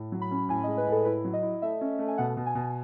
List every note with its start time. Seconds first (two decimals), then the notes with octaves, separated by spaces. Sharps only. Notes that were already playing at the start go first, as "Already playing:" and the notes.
Already playing: A2
0.12 F#3
0.22 B5
0.31 C#4
0.49 A2 G#5
0.64 D#5
0.67 G#3
0.78 B4
0.87 A2 A4
1.05 E4 B4
1.24 F#3
1.33 D#5
1.43 E4
1.62 A3 E5
1.81 C#4
1.99 A3
2.08 G#5
2.18 B2 F#5
2.37 B2
2.46 G#5
2.55 B2